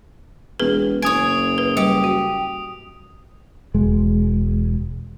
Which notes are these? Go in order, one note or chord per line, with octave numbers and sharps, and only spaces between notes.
E1 G#4 B4
F#1 C#5 G#5 D#6 D7
B4
G3 G4
F#4
E1 G#3